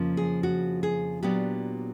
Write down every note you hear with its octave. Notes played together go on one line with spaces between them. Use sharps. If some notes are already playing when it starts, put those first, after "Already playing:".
Already playing: F2 C#3 F3 A#3
G#4
F#4
G#4
A#2 F#3 B3 D4 G4